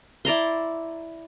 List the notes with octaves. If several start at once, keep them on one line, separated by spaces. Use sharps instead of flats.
E4 D5 A#5 C6